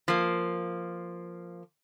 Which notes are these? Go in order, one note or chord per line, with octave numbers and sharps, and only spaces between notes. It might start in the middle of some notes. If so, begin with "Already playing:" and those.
F3 A#3